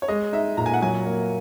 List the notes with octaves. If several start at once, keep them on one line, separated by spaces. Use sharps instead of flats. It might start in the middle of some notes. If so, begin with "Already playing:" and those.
C#5
G#3 D#5
D#4 E5
A#2 A#5
G#5
F#5
F#3 G#5
A#3